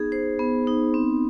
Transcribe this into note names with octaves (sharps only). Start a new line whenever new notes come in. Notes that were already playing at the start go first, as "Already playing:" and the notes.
Already playing: B3 D#4 G#4
C5
B3
D#4
C4